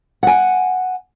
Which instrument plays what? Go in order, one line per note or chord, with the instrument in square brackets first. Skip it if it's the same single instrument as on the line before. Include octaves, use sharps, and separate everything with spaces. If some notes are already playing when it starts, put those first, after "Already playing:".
[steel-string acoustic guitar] F#5 G#5